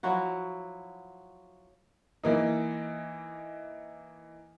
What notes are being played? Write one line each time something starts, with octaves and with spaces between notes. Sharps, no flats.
F3 F#3 E4 F#4
E3 A#3 D#4